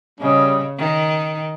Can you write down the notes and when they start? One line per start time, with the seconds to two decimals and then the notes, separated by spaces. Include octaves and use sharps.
0.20 C#3 G3 C#4 G#4 D#5
0.78 D#3